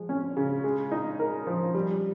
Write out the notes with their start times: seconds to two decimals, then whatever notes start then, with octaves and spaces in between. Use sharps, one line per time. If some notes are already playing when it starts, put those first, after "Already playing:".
Already playing: F3 G#3
0.09 C#4
0.37 C#3
0.64 G#3
0.92 D#4
1.19 A#4
1.47 F3
1.75 G3